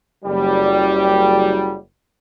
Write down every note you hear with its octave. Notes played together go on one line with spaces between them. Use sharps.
F#1 G3